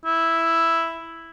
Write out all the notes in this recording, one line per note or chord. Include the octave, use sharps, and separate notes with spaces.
E4